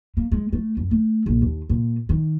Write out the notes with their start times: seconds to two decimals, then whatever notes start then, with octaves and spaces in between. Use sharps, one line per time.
0.17 A#3
0.32 G#3
0.53 A3
0.77 F#2
0.91 A3
1.26 A#1
1.42 D#2
1.69 A#2
2.09 D#3